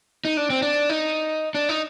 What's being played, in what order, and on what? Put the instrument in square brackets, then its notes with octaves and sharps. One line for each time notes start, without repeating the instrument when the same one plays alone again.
[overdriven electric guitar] D#4
D4
C4
D4
D#4
D4
D#4